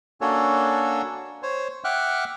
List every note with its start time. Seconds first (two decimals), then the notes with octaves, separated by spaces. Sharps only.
0.21 A#3 C#4 D4 F#4 A4 C#5
1.43 C5 C#5
1.84 E5 F#5 G5 D6 F6 F#6